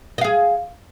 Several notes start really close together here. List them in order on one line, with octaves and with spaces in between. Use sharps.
D#5 F5 G#4